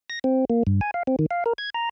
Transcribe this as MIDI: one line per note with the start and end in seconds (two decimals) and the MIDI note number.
0.10 0.19 94
0.24 0.45 60
0.50 0.63 58
0.67 0.81 43
0.81 0.91 80
0.94 1.03 77
1.07 1.16 60
1.19 1.26 51
1.31 1.44 77
1.46 1.53 70
1.58 1.70 92
1.74 1.89 82